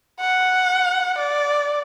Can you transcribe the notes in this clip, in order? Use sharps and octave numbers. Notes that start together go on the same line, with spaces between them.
F#5
D5